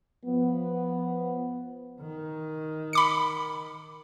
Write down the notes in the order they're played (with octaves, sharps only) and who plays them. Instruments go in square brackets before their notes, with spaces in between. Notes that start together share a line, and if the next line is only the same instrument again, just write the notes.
[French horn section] F3 B3
[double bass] D#3
[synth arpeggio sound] B5 D6 C#7